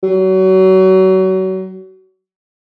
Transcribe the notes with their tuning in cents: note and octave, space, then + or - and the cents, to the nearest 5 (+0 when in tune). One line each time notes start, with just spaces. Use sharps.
F#3 +30